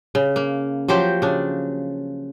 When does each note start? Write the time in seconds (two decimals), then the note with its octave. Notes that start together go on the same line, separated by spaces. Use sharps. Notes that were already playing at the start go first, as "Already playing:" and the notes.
0.15 C#3
0.36 A#3
0.88 F3 F#3 G4 C5
1.22 C#3 D4